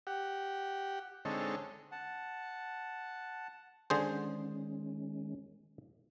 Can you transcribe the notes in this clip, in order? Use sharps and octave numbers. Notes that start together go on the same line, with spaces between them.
G4 F#5
D3 G#3 C4 D#4 A4 C#5
F#5 A5
D3 D#3 G#3 C#4 G#4 C5